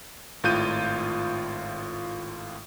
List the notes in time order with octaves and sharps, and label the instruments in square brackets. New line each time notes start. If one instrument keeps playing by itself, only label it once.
[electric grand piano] G#1 A2 F4 G6 D#7